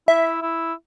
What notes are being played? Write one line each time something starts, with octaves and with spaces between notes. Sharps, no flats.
E4 E5
E4